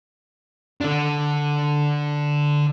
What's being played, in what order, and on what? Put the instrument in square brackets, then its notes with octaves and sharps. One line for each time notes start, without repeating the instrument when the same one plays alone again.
[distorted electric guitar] D3 D4